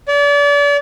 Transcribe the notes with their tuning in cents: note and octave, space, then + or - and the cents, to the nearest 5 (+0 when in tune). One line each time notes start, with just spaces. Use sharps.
D5 -35